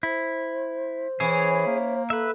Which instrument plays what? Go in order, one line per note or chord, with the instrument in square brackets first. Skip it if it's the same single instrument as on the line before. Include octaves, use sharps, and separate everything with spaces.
[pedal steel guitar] E4 [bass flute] C5
[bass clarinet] E3 [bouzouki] C#4 E4 C#5 [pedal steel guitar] G#4
[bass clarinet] A#3
[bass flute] A4 [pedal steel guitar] B4 E5